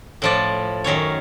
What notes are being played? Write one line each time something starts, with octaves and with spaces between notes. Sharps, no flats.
A2 F3 D5
F#2 D#3 C#4 C#5